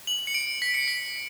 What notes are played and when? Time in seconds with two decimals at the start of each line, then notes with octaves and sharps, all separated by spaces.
0.07 F#7
0.27 C#7
0.34 D7
0.62 B6
0.74 C#7
0.88 B6